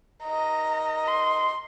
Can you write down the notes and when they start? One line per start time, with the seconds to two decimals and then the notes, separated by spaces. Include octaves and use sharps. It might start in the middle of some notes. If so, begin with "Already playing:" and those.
0.23 D#4 A#4 D#5 A#5
1.08 C6